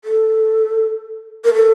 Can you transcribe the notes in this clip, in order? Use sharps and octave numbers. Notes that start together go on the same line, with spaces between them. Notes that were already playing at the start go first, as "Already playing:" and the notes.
A4
A#4
A4